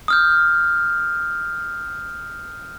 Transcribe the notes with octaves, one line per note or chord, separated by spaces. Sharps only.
D#6 F6 G6